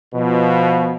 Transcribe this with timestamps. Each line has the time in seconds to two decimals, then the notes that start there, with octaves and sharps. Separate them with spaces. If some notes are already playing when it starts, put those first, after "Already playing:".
0.15 B2 F3